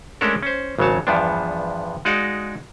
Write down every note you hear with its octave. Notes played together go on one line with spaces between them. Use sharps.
G#3 A3 C#4 D4 A4 A#4
C#4 C5
G#1 C#3 F#3 C#5 A5
E2 G2 F3 B3 D4
G#3 D#4 F#4 D5 D#5 F5